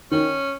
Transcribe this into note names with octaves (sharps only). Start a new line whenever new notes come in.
D#3 C#4